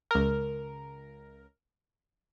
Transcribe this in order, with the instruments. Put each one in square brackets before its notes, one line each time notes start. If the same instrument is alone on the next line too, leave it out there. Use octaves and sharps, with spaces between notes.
[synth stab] C#2 A#4